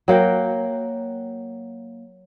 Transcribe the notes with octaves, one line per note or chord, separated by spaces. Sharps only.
F#3 A#3 F#5 G5